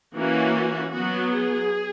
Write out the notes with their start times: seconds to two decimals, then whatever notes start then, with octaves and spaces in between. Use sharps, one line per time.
0.15 E3 A#3 C#4 F#4
0.94 F#3 B3 F#4
1.33 G#4